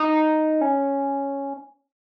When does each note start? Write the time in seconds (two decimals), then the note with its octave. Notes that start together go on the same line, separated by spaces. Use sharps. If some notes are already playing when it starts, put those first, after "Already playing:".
Already playing: D#4
0.61 C#4